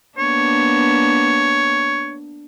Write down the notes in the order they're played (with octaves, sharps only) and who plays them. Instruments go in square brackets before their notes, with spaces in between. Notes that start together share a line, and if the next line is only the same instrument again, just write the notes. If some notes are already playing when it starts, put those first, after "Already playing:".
[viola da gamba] A#3 B3 D4 [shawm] C#5